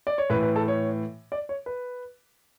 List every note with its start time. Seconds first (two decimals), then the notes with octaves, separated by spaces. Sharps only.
0.07 D5
0.18 C#5
0.30 A2 E3 B4
0.43 B4
0.56 A4
0.68 C#5
1.32 D5
1.49 C#5
1.66 B4